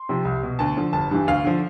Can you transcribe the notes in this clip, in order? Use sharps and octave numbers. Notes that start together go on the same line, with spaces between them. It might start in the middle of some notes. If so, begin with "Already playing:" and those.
Already playing: C6
C3 F3
C2
B2
D2 A5
D3 F3
G1 A5
G2 E3
D2 F5
D3 F3